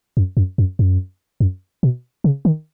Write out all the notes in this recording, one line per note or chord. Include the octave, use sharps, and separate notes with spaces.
F#2
F#2
F#2
F#2
F#2
B2
C#3
D#3